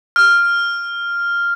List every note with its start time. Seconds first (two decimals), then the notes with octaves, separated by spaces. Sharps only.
0.16 F6